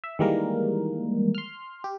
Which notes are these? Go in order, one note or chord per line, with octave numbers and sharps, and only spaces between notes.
E5
D#3 E3 G3 G#3 A#3 A#4
C6 F6
G4